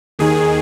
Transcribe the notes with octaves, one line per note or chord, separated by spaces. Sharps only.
D#2 D#3 G#4